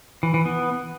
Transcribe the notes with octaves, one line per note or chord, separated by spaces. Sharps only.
E3
E3
B3